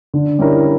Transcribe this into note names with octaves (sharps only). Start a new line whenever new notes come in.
D3
G3 C#4 E4 A#4